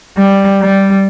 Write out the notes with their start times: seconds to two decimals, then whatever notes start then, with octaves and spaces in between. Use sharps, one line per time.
0.17 G3
0.61 G3